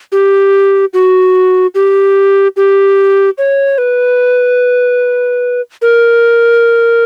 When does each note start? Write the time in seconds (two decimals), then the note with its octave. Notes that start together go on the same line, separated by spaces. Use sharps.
0.12 G4
0.94 F#4
1.75 G4
2.57 G4
3.38 C#5
3.78 B4
5.82 A#4